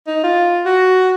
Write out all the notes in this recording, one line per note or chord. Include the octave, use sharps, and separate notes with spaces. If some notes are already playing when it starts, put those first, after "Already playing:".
D#4
F4
F#4